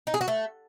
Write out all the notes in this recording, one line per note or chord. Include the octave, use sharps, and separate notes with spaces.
D#4
G#4
F#4
A3